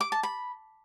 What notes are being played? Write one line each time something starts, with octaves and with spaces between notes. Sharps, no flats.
D6
A5
B5